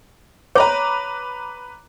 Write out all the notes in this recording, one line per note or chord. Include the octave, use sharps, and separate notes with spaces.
B4 C#5 A#5 D6